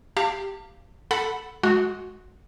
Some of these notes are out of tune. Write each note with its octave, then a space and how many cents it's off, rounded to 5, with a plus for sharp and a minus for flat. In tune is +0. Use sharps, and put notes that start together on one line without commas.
G4 +0 F5 -10 A5 +40
A4 +0 F#5 +0 B5 +0
G#3 +30 F#4 -10